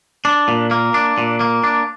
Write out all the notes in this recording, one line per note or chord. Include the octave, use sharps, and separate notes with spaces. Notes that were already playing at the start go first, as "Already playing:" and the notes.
D4
A#2
A#3
D4
A#2
A#3
D4